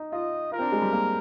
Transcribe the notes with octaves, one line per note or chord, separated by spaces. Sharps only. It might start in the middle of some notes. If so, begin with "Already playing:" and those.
Already playing: D#4
F4 D#5
F4 A#4
C4
D4
G#3
G3
A#3